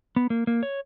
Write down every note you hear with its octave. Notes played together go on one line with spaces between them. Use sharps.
B3
A#3
A#3
C#5